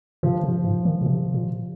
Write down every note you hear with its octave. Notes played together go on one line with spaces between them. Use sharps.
C3 F3
C3
F3
G#2
D#3
A#2
C3
A#2